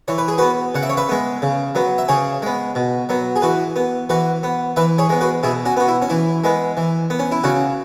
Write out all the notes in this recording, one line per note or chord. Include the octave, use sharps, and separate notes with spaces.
E3 C#5
B4
G#4
B3 F#4 B4
C#3 F#5
E5
C#5
B4 E5
G#3 B3
C#3
F#3 B3
E5
C#3 G#4 C#5
G#3 B3
B2
F#3 B3
G#4
E3 F#4 B4
B3
E3 F#4 B4
B3
E3 B4 E5
G#4 C#5
G#3 B3
F#4 B4
B2 E4 G#4
C#4 F#4
B3 F#4
E4
C#4
E3 E4
G#3 B3
E3
B3
C#4
E4
C#3 C#4 F#4